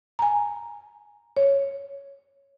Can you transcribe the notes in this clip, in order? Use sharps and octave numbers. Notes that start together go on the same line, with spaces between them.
G#5 A#5
C#5